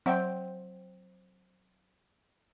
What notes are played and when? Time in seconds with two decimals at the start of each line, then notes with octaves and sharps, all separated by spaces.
0.06 F#3 C4 E5 F#5 G5